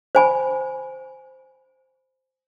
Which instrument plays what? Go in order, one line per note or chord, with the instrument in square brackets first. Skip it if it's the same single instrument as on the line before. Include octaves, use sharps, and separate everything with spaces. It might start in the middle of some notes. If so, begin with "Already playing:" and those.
[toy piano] C5 G#5 B5